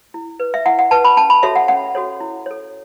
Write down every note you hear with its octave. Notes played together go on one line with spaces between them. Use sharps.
E4
B4
E5
E4 F#5
F#5
B4 A5
B5
C#4 A5
B5
F#4 A4 C#5 E5
F#5
C#4 F#5
F#4 A4 C#5
E4
A4 C#5